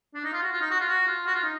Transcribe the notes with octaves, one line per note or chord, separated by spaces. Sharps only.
D4
D#4
F4
F#4
F4
D#4
F#4
F4
F#4
F4
F#4
F4
D#4